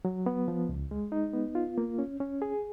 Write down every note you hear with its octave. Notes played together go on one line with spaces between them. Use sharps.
F#3
B3
F3
C#2
G#3
D#4
B3
F4
A#3
C#4
C#4
G#4